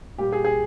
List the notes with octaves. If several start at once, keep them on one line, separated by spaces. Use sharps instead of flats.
A#2 G3 G4
G#4
G#4